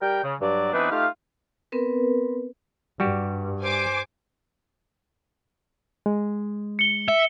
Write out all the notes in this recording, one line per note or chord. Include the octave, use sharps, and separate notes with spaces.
G3 A#4 G5
C#3
G2 F#3 D5
E3 B3 C4 D4 D#4 B4
A3 D#4 F4 G4 F5
B3 C4 A#4 B4
G2 G3 F#4 G4
C5 G#5 D6
G#3
C#7 G7
E5